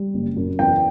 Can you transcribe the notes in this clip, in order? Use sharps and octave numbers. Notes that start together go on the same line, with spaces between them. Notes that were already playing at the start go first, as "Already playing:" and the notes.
Already playing: G3
F#1
F#2
E2 G5